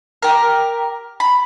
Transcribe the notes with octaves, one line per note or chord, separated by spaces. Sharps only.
G4 A#4
B5